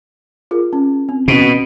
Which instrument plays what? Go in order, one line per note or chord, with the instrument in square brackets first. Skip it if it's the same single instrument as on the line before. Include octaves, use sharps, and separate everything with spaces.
[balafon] F4 G#4 A#4
C#4
C4
[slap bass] B2 [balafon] C#4